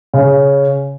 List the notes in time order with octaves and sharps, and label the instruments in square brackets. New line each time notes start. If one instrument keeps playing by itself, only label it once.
[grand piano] C#3